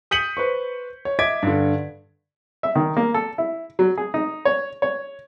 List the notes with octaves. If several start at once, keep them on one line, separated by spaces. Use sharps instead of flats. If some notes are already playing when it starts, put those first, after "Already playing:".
D#6 G6 B6 C#7 D#7 F#7
B4 C5 C#6
C#5
D#5 E5 D6 G#6 B6 D7
G2 D3
E5
D#3
A#3
A4
E4
F#3
G#4
D#4
C#5
C#5